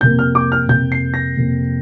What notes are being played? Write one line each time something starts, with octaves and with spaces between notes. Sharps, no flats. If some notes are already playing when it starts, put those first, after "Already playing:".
F2 C3 A#3 G6
F6
D6
F6
F2 C3 A#3 G6
C7
A#6
F2 C3 A#3